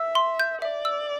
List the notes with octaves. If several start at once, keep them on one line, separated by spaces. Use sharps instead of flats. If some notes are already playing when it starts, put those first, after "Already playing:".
Already playing: E5 E6
C6
G6
D5 E5
E6